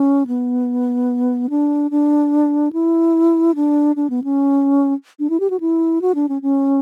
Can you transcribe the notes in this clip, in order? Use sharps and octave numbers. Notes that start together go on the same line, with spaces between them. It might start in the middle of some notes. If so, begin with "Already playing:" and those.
Already playing: C#4
B3
D4
D4
E4
D4
D4
B3
C#4
D4
E4
G4
F#4
E4
F#4
D4
C#4
C#4